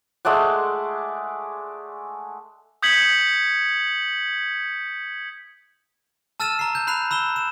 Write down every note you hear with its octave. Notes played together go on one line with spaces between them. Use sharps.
G#3 A3 D5 F#5
D#6 G6 G#6 B6 C#7 F#7
A5 E6 F6 A6 D#7 E7
A#5 C7
G6
B5 F#6 C7 F7
B5 E6 E7 G7
E7